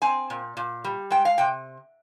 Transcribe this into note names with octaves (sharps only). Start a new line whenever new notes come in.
C4 G#5
A#2
A#2
G3
G#3 G5
F5
C3 G5